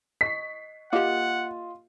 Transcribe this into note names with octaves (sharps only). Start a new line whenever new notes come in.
D#5 C#6 B6 C7
A#3 F4 G4 D#5 F#5